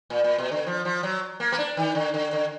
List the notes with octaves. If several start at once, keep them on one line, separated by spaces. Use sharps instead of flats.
A#2
A#2
B2
D3
F3
F3
F#3
A#3
B3
D4
D#3
D3
D3
D3